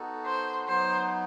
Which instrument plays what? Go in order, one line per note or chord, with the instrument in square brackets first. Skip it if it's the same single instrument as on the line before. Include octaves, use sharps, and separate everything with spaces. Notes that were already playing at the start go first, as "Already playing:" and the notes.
Already playing: [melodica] B3 D#4 F#4 A4
[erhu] C5
[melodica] F#3 B3 D#4 [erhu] C5